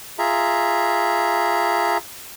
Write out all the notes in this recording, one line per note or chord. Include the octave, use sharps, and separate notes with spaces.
F4 G#4 E5 A#5